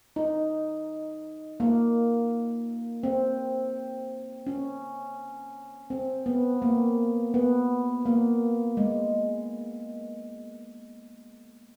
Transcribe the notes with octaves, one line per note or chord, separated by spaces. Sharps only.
D#4
A#3
C4
C#4
C4
B3
A#3
B3
A#3
G#3